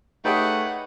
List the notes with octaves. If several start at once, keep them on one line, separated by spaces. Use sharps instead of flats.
A3 D#4 G4 G#4 B4 C#5 F#5 G5